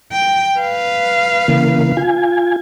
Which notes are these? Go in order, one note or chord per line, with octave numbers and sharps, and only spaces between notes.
G5
B4 F5
C#3 E3 A#3
F4 G#5